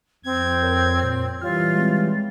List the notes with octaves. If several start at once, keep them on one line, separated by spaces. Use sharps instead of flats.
F2 C4 G#6
A#4 C#5
A#2
E3 G3 F4 C#5 F6
G#3 C4